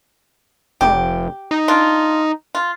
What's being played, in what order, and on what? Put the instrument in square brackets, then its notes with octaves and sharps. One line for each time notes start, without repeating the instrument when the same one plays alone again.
[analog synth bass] F1 [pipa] G4
[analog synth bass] D#4
[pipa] D4 F4
F4